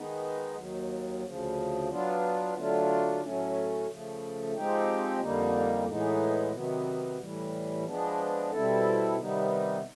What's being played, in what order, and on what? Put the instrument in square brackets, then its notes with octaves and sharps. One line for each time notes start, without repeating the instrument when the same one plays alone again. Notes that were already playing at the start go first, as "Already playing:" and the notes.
Already playing: [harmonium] D#3 G#3 B3 D#4
D#2 D#3 F#3
D2 C#3 F3
F#3 B3 D4 F4
D3 F#3 A3 D4 F4
A2 F#3 A3 C#4
C#3 F3 A3
F3 G#3 C4 D#4 G4
F2 D3 G3 A#3 D#4
A2 E3 G#3 B3 D#4
C3 D#3 F#3 B3
A2 E3 G3
F3 G#3 B3 D4
B2 G3 C4 E4 A4
C3 D#3 G3 B3 D#4